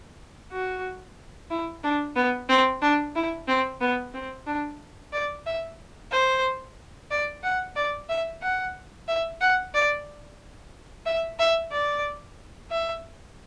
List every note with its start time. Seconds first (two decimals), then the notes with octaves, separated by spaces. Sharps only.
0.52 F#4
1.50 E4
1.83 D4
2.16 B3
2.49 C4
2.82 D4
3.15 E4
3.48 C4
3.81 B3
4.14 C4
4.47 D4
5.13 D5
5.46 E5
6.12 C5
7.11 D5
7.44 F#5
7.76 D5
8.09 E5
8.42 F#5
9.08 E5
9.41 F#5
9.74 D5
11.06 E5
11.39 E5
11.71 D5
12.70 E5